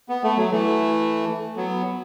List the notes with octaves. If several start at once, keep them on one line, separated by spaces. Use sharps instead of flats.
B3
A3
F#3
E3 A3
F#3 B3